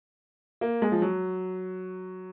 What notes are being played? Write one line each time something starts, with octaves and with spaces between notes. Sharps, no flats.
A#3
G#3
F3
F#3